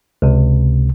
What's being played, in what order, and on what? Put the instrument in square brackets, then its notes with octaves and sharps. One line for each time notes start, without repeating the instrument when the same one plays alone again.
[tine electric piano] C#2 C3